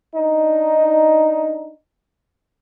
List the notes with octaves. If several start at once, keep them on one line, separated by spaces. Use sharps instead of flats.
D4 D#4